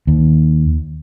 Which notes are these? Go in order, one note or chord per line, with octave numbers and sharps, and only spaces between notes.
D#2